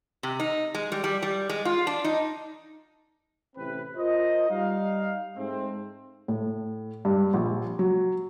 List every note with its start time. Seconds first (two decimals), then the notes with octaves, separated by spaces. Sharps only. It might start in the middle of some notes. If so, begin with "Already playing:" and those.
0.23 C3
0.40 D#4
0.75 G#3
0.92 G3
1.04 G3
1.23 G3
1.49 G#3
1.65 F4
1.87 D4
2.05 D#4
3.56 A1 C3 C4 B4
3.96 F4 A#4 C5 D#5
4.49 G3 D#4 F5
5.37 G#2 G#3 A3 C4
6.28 A2
7.05 G2
7.34 A#1
7.79 F#3